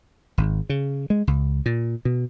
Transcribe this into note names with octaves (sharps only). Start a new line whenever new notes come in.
G#1
C#3
G#3
C#2
A#2
B2